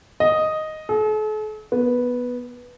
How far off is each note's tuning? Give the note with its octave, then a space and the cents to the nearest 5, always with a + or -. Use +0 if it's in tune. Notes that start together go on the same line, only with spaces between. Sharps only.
D#5 +0
A4 -45
B3 -5